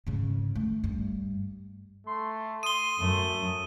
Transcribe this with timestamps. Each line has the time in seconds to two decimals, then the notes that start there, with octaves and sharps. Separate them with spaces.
0.07 G#2 C#3
0.56 A3
0.84 G2
2.07 A3 C6
2.63 C6 D#6 D#7 G7
3.00 F#2 A3